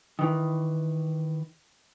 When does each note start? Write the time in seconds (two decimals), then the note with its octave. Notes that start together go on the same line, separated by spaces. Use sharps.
0.19 D#3 E3